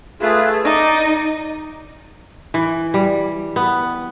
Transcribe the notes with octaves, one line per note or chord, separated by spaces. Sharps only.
A3 F4 G#4 B4
D#4 D5 D#5 D6
E3
G3
B3